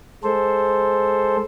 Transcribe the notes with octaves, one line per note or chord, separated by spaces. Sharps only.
G#3 A4 C5